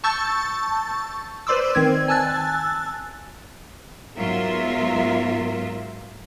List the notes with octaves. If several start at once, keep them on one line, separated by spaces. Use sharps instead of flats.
A5 C#6 E6 G6 A6
B4 C5 D5 C6 D6 E6
D#3 C4 G#6
G#5 A5 E6 F#6 A6
G#2 F#3 B3 F4 A#4 E5